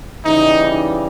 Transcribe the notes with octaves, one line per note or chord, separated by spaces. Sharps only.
C#3 E3 G3 D#4